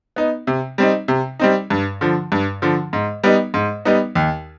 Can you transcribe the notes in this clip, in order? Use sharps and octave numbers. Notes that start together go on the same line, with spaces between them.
B3 D#4
C3
G3 C4 D#4
C3
G3 C4 D#4
G2
D3 F3
G2
D3 F3
G#2
G3 B3 D#4
G#2
G3 B3 D#4
D#2